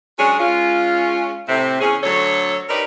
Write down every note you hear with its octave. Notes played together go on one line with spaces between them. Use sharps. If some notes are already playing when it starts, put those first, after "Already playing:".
F#3 G#3 C#4 D4 G#4
G#3 C#4 F4
A2 C3 C4
E2 C#4 G#4
D2 D3 F#3 A4 C#5
D#4 G4 A#4 B4 C#5 D5